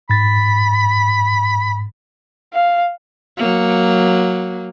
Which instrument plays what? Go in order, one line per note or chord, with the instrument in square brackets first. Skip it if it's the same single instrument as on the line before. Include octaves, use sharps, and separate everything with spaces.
[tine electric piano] G#2 A6 [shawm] B5
[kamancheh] F5
[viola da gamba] F#3 A#3